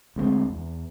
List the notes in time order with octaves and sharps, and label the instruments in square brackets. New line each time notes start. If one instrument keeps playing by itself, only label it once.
[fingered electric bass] D2 G#3 A3 C4
E2